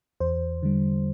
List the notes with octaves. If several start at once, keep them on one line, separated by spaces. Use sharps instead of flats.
E2 C5
D3 G3